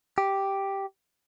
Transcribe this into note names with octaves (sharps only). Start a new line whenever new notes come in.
G4